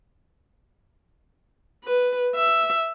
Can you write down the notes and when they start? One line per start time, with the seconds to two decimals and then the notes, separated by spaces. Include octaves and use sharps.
1.84 B4
2.35 E5